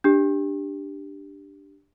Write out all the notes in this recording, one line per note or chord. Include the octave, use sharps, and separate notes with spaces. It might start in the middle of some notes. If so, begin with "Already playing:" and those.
D4 G4